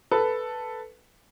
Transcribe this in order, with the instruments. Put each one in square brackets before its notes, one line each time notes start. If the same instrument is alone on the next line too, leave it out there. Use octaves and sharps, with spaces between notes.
[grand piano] A4 B4